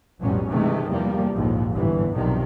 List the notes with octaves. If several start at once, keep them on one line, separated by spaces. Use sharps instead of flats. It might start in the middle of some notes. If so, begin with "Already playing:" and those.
B1 F2 A2 F#3 G3 C#4
G2 C3 D#3 E3 G#3 A3
E2 C3 F3 G3 A#3
A#1 D#2 G#2 F3
G1 A2 E3
B1 G2 C3 D#3 F3 G3